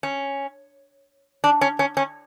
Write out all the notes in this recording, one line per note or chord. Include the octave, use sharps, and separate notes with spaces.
C#4
D4
C#4
C#4
C#4